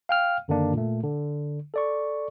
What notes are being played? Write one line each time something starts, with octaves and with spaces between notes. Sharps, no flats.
F5 G5 F6
F#2 D3 D#3 A#3 D4
A#2 A3
D3
A4 D5 C#6